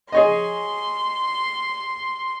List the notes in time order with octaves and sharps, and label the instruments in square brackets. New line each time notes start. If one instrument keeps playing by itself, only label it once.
[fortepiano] G#4 C#5 D#5 [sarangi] C6